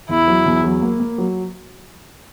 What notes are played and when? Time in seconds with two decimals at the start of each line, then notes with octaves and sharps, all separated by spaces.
0.09 E2 E4
0.28 F#3
0.46 E2
0.64 F#3
0.82 A#3
1.00 A#3
1.18 F#3